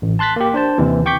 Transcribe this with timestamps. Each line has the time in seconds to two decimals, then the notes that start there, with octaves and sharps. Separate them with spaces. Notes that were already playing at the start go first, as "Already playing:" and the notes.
0.02 A1
0.19 A5 C6 F#6 A6 B6
0.36 A#3 G4
0.54 D4 C5 A5
0.78 D#2 C3 E3
1.06 G5 C#6 D6 G6 B6